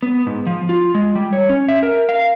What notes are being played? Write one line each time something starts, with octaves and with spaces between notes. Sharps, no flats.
B3
G#2
F3
F4
G#3
G3
C#5
C#4
E5
A#4
F5